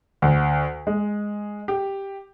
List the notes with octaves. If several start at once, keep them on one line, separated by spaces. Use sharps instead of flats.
D2
G#3
G4